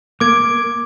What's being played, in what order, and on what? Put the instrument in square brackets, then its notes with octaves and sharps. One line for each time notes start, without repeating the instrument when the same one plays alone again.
[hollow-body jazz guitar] A#3 [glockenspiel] D6 G#6 D7